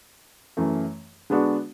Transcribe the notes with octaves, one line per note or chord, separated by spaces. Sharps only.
F#2 E3 A3
D3 G#3 B3 D4 F#4